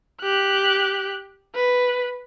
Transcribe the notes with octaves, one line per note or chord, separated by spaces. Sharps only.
G4 F#6
B4